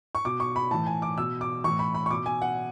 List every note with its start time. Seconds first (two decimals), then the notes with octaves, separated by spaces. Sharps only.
0.15 C#6
0.25 B2 D6
0.40 C#6
0.56 B5
0.71 A2 E3 A5
0.87 G#5
1.02 D6
1.18 B2 E6
1.41 D6
1.64 A2 E3 C#6
1.79 B5
1.95 B5
2.06 C#6
2.11 B2 D6
2.26 G#5
2.42 F#5